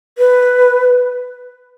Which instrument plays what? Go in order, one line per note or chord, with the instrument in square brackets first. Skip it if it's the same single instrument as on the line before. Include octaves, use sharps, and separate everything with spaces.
[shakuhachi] B4